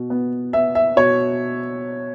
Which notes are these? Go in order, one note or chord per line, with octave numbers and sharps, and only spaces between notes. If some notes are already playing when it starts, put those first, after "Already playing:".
Already playing: B2
B3
B3 E5
E5
B2 C#5